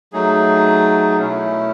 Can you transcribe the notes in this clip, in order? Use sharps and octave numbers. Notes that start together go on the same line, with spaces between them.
F#3 A3 D#4 G#4
B2 A3 C#4 E4